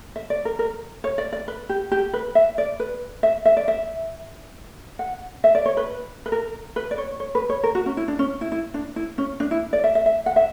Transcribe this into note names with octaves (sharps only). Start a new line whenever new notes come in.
E5
D5
A#4
A#4
C#5
D5
D5
B4
G4
G4
B4
E5
D5
B4
E5
E5
D5
E5
F#5
E5
D5
C#5
B4
B4
A#4
B4
D5
C#5
C#5
B4
C#5
A#4
F#4
C#4
E4
D4
C#4
E4
E4
D4
E4
C#4
D4
E4
D5
E5
E5
E5
F#5
E5